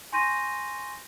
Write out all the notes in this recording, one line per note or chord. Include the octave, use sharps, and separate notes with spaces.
G#5 C6 C#6 G6 A#6 D#7